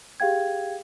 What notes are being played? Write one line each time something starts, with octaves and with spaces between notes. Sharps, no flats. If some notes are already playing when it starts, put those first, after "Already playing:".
G4 G#4 F5 G5 G#6